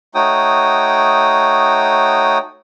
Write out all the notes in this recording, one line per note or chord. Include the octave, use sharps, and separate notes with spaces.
A3 D#4 F#4 C#5 G5 D#6